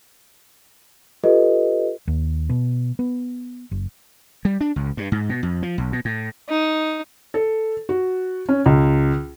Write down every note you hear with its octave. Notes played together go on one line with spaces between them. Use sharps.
F4 G4 A4 B4 D#5
D#2
B2
B3
F#1
G3
D4
C#2
G2
G#2
B2
F2
F3
B1
B2
A2
D#4
A4
F#4
C#4
C#2